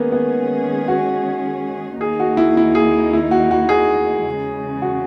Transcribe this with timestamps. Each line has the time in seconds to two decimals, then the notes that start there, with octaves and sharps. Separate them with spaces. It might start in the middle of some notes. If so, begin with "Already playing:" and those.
Already playing: D#3 G#3 A#3 B3 C#4 G#4
0.12 B3
0.88 F#4
2.01 D#2 D#3 A#3 D#4 G#4
2.20 F#4
2.37 E4
2.57 E4
2.75 G#4
3.13 E4
3.31 F#4
3.51 F#4
3.69 G#4
4.26 E2 C#3 G#3
4.82 F#4